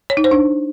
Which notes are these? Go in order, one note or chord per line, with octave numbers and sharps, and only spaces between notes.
C#5
D#4
C5
D4